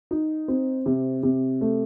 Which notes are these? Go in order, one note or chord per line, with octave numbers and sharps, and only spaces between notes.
D#4
C4
C3
C3
A3